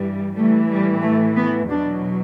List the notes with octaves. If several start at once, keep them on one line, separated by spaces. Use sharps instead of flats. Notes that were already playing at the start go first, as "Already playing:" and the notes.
Already playing: G2 E3 G3
A2 E3 G3 A3
G3
A3
B3
E2 B2 F#3 D4